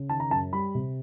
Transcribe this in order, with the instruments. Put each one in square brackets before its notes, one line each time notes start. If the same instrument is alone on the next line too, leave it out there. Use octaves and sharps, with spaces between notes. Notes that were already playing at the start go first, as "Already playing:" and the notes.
Already playing: [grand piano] C#3
D#3 A5
A#5
F#2 A5
G3 B5
C3